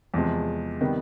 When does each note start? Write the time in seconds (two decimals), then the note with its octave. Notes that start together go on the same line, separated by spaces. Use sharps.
0.14 E2 C3 F3 G#3
0.80 C3 D#3 G3 B3